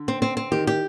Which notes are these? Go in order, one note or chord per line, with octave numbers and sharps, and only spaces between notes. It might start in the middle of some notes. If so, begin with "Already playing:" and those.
Already playing: D3
C4
C4
C4
D#3 G4
G4